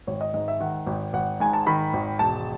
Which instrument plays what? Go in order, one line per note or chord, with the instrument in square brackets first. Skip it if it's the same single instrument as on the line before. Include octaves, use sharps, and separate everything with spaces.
[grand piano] G#1 C#5
D#5
G#2 D#5
E5
D#3 F#5
G#1
G#1 F#5
G#2 G#5
A5
D#3 B5
G#1
E1 A5